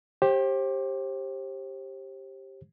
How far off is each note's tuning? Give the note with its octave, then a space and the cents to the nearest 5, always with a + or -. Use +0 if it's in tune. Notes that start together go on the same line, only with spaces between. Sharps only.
G4 +0 C5 +35